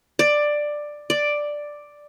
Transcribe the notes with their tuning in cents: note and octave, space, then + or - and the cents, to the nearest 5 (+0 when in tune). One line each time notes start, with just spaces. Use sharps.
D5 +10
D5 +5